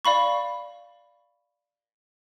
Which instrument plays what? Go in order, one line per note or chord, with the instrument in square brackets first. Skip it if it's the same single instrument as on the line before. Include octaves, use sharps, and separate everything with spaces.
[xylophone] D5 F5 B5 C#6